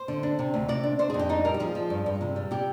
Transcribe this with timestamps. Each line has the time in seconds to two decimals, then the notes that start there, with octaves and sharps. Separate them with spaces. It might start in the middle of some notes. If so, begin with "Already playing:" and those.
Already playing: C5
0.08 D3
0.23 D4
0.39 C3
0.54 D2
0.68 C3 D5
0.83 D4
0.99 D4 C5
1.10 G#4
1.14 F2
1.19 G4
1.29 D4 D#4
1.45 G3 A#4
1.54 G4
1.60 F3 G#4
1.75 F3
1.90 G2
2.06 G2
2.21 C3
2.36 G3
2.51 C3 G4